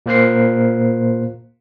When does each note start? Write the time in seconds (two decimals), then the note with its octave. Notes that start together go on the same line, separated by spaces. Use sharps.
0.06 A#2 A#3 C5 F#6 C7